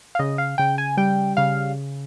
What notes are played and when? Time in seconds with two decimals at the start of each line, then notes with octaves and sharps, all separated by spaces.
0.15 F5
0.19 C#3 D#5
0.38 F5
0.58 C#3 G5
0.78 G#5
0.97 G3 G5
1.37 C#3 F5